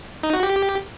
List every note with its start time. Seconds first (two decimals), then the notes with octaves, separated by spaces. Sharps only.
0.23 D#4
0.33 F#4
0.43 G4